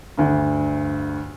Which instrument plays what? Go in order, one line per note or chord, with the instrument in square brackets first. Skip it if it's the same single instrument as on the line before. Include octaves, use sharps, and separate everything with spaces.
[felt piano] D2 G2